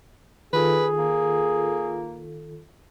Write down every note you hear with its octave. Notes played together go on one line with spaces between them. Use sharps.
D#3 F4 G#4 A4 B4
A#3